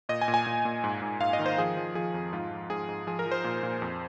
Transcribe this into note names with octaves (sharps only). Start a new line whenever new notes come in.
A#2 D#5
G#5
A#2
G#5
A#2
A#2
G#2
G#2
G#2 F5
D#5
D#3
C5
F3 G#4
F3
F3 G#4
F2
G#2 F4
F3
G#2 G#4
G#2
F3 G#4
A#4
F3
C5
A#2
A#2
F2